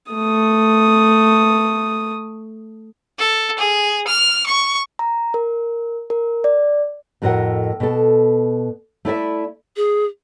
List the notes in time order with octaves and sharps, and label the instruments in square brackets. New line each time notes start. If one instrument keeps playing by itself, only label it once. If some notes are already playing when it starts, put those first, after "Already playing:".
[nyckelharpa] A3 D#6
[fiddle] A4
G#4
F6
C#6
[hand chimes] A#5
A#4
A#4
D5
[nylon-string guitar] F2 A2 F#4 A#4 D#5 F#5
B2 A4
A3 E4 D5 E5
[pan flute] G#4